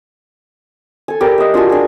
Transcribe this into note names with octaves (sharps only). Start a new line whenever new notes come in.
A4 G#5
G4 A#4 B4 D5
D#5 E5
D4 F4 F#4 G#5
D4 G#4